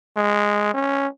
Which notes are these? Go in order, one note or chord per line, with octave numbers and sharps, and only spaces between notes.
G#3
C#4